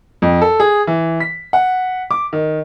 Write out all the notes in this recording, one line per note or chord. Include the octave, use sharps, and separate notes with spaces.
F2
A4
G#4
E3
B6
F#5
D6
D#3